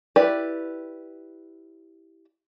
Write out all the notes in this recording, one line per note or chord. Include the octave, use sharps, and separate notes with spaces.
E4 G4 B4 D5